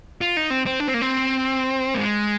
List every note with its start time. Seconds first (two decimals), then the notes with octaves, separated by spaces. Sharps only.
0.21 F4
0.37 D#4
0.50 C4
0.66 C4
0.80 D4
0.88 C4
0.94 A#3
1.01 C4
1.94 A#3
1.98 G#3